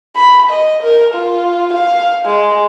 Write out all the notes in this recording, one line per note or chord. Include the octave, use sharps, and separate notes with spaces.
B5
D#5
A#4
F4
F5
G#3